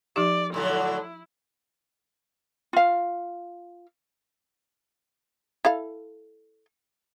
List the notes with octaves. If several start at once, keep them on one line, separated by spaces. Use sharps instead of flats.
F3 D#4 G4 D5
A2 D3 F#3 E4
F4 F5
E4 A4 F5